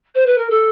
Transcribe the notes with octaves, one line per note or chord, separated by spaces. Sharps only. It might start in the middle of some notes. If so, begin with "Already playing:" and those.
C5
B4
A#4
A4